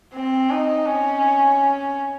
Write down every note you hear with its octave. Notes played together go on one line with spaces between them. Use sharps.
C4
D#4
C#4